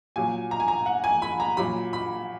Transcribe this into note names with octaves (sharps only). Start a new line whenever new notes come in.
A#2 F#3 G#5
A#5
G#5
A#5
F#5
G#5
B5
A#5
A#2 F#3 B5
B5